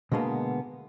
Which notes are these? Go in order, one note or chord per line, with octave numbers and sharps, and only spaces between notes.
B2 D3 G#3 A#3 B3